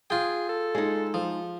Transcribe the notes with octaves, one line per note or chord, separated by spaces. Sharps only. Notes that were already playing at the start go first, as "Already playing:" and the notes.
F4 G#4 G5
A4
G#3 D#4
F3